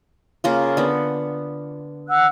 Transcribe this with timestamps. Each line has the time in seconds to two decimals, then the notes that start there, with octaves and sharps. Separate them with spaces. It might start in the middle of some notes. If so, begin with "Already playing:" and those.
0.44 C#3 A#3 F4
0.77 D3 B3
2.09 F#5 E6 F#6